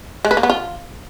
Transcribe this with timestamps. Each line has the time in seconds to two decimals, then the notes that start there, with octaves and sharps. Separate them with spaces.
0.25 G#3
0.31 B4
0.37 A#3
0.43 B3
0.50 F4